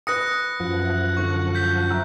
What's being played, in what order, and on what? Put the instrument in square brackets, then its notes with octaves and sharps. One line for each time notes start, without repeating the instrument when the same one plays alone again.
[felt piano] B4 D#6 [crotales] F#6 A#6 C#7
[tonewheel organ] F#2 F3 F#5
[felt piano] E5
[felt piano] D3 [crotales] C#6
[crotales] G6 B6
[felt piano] E5 A#5 E6